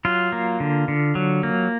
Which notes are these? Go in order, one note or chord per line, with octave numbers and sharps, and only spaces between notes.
F#3 F4
A#3
D3
D3
F#3
A#3